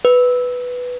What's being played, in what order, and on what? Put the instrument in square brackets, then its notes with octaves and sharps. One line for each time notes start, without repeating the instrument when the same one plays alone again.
[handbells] B4